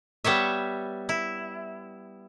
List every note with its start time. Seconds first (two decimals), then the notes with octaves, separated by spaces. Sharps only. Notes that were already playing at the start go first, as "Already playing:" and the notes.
0.24 G3 B3 C#5 E5
1.09 E4